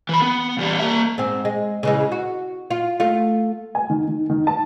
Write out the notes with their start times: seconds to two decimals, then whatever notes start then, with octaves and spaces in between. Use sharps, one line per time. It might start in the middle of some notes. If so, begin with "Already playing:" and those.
0.09 E3 B5
0.22 B3
0.58 E2 G3
0.79 A#3 E5
1.18 G#2 C4
1.45 G#3
1.83 C#3 E3 G#3
2.12 F#4
2.70 F4
3.00 A3 F4
3.75 G#5
3.90 D#3
4.08 D#3
4.30 D#3
4.47 A5